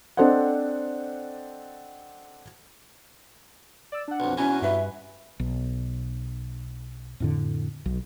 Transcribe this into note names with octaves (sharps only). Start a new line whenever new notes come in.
C4 D4 A4 C5 D#5 F#5
D5 E6
D4 F#5
B1 F2
E2 B2 F#3 C#4 G#5
G2 B4 E5
B1
F2 A2 D3
B1